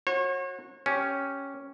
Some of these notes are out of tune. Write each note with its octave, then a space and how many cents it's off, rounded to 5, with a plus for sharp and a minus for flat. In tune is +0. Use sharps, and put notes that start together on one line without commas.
F#4 -15 C#5 -40
C#4 +0 G4 +0